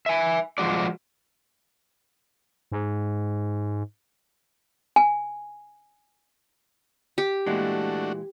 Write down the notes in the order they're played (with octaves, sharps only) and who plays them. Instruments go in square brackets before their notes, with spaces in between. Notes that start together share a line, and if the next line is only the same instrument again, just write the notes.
[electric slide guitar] E5 G#5
F3 G#3 F#4 D5
[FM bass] G#2
[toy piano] G#5
[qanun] G4
[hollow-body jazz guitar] A#2 E3 G#3 [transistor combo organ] A3 D4 F#4